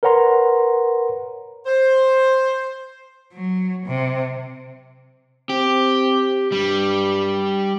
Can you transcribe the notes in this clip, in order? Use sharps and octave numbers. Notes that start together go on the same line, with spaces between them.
A#4 B4 C#5 F#5 A#5 C6
C5
F#3
C3
C4 G4
G2 G3